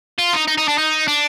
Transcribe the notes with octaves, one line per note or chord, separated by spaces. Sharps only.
F4
D#4
D#4
D#4
D4
D#4
D4